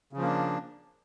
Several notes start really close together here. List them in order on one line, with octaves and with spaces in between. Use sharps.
C#3 F3 A#3 D4